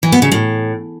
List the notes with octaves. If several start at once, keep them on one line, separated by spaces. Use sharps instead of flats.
E3
B3
C#3
A2